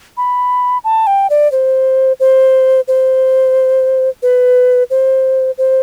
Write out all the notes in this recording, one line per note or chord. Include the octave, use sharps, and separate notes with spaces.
B5
A5
G5
D5
C5
C5
C5
B4
C5
C5